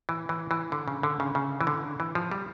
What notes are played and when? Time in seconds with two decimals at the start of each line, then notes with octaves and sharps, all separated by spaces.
0.09 E3
0.29 E3
0.51 E3
0.72 D3
0.88 C#3
1.03 D3
1.20 C#3
1.35 C#3
1.61 E3
1.67 D3
2.00 E3
2.15 F3
2.31 G3